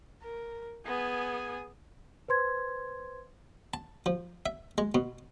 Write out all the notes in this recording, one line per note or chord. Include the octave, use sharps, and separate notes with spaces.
A#4
B3 G#4 G#5
B4 C5 C6 G#6
A5
F3
E5
G#3
B2